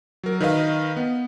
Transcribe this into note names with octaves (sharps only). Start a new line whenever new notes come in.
F#3 A#4
D#3 B4 D#5 F5
B3